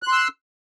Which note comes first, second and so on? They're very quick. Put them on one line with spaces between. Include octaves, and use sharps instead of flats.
F#6 C6 E6